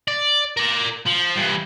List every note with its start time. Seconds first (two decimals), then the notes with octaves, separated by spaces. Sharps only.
0.08 D5
0.57 A#4 D5
1.06 F3
1.36 G2 E3